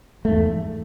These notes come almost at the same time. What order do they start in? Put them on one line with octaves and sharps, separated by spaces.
A3 G#2 E2